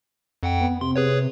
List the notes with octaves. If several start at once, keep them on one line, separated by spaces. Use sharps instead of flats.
F2 F#5 G5
B3
C3 C6
G#4 B4 C#5